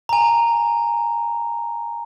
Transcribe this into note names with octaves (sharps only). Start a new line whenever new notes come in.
G#5 A#5